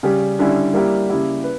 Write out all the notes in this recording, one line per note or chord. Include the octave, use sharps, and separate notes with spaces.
C#3 G3 C#4 G4
D3 G3 C#4 E4
G3 A#3 E4 G4
C#3 G3 A#3 E4 G4
B4